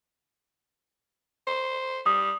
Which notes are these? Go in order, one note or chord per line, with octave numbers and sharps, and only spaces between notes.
C5
G3 D#6